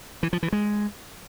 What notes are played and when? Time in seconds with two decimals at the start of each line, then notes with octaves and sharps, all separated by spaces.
0.23 E3
0.33 F3
0.43 E3
0.53 G#3